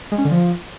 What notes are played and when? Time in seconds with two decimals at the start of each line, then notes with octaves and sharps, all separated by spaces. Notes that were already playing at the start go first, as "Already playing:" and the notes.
0.12 G#3
0.18 C#4
0.25 D3
0.31 F3